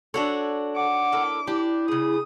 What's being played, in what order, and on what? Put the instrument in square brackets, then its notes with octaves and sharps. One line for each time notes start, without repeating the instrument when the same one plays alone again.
[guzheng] D4 F#4 C#5 [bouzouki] A4
[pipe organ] F#5 [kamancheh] D6
[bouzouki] A#3 E4 A4
[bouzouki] D4 [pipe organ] E4 [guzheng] G4
[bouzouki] C#3 G#4 [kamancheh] D#6